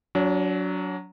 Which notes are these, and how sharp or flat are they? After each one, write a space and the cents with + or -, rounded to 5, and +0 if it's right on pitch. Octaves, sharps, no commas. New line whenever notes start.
F#3 +0 D4 -35